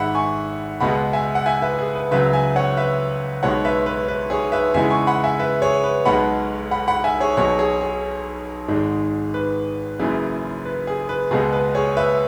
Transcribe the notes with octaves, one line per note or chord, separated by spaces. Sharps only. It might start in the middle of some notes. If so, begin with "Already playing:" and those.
Already playing: G#1 G#2 G#3 E5 F#5 B5
G#5 C#6
C#2 B2 G#3 B3 F#5 B5
E5 G#5
F#5
E5 G#5
B4 E5
G#4
B4
C#2 C#3 F#3 B4 E5
E5 G#5
C#5 F#5
B4 E5
B1 B2 G#3 B3 C#5 F#5
B4 E5
B4
B4
G#4 C#5
B4 E5
E2 C#3 E3 G#3 B3 E5 G#5
G#5 C#6
F#5 B5
E5 G#5
B4 E5
G#4 C#5
B4
B1 B2 G#3 B3 F#5 B5
F#5 B5
F#5 B5
E5 G#5
G#4 C#5
B1 B2 F#3 B3 G#4 C#5
G#4 C#5
G#4
G#1 G#2 G#3
B4
F#1 F#2 C#3 E3
B4
G#4
B4
C#2 B2 G#3 B3 G#4
B4
G#4 C#5
B4 E5